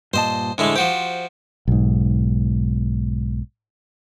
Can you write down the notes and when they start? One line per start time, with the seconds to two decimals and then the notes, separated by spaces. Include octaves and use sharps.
0.13 G2 A#2 C5 D#5 A5
0.58 A2 D3 G#3 A3
0.76 F3 F#4 G4 C5
1.68 B1 G#2